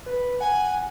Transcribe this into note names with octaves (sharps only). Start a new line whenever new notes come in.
B4
F#5 G#5